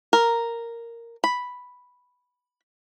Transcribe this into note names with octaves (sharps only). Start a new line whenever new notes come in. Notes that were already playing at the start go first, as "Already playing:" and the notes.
A#4
B5